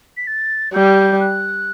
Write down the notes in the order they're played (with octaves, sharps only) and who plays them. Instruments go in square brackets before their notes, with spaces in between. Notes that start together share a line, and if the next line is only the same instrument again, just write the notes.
[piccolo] B6
A6
[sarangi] G3 [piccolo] G6
[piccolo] F#6